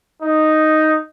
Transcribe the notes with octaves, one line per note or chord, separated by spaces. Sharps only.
D#4